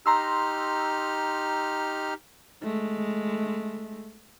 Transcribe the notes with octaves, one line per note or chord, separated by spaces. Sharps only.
D#4 G4 A#5 C6 E6 F6
G#3 A3